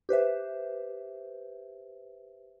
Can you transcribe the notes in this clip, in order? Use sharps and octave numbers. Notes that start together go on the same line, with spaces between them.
G4 B4 C5 E5